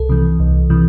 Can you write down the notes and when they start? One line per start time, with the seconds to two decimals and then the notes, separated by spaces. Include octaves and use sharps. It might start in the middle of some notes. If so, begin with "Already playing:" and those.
Already playing: C2 A4
0.09 C3 E3
0.40 C2
0.70 C3 E3